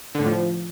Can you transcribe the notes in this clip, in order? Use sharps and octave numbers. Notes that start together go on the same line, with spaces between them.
D3
A2
F3